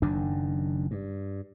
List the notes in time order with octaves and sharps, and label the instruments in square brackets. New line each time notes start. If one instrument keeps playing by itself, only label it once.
[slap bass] F#1 F#2 D#3 D4
G2